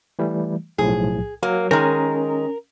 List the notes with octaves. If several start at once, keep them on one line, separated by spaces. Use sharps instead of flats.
E3 G3 A3
B1 A2 F3 G#4
F#3 A#3
D#3 G#3 C#4 A#4